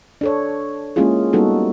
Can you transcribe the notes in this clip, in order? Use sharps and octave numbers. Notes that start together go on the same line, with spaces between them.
D4 A4 C#5
G#3 A#3 C#4 E4 F4 G#4
G3 A#3 B3 D#4 F#4 A4